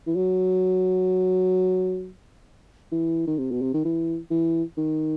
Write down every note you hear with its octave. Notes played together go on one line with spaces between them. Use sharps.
E3
F#3
E3
D#3
C3
B2
C3
D#3
E3
E3
D#3